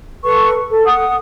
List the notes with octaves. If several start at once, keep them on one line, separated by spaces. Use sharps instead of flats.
A4 B4 C#6
A4
F#5 D#6